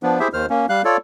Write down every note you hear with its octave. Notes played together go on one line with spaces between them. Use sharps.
F3 B3 D4
E4 G4 G#4 C5 E5
D#2 D#3 C5 F6
A#3 C#4
G3 F5 F#6
F4 A4 C#5 D5